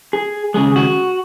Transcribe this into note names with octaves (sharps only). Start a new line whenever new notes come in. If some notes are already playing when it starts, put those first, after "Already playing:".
G#4
D#2 C#3 G#3 G#4
F#4